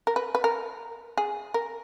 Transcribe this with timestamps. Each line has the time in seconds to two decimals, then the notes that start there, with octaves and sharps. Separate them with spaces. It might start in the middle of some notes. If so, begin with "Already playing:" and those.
0.07 A#4
0.16 B4
0.35 B4
0.44 A#4
1.18 G#4
1.54 A#4